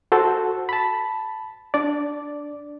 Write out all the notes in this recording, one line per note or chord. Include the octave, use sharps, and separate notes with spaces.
F#4 A4 C5
A5 B5
D4 D5